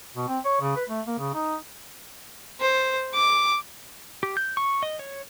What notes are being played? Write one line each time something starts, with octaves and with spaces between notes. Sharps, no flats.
B2
C4
C#5
C#3
B4
A3
A#3
C#3
D#4
C5
D6
G4
G6
C#6
D#5
C#5